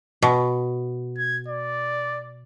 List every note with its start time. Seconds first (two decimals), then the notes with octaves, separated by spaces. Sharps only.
0.22 B2
1.18 G#6
1.48 D5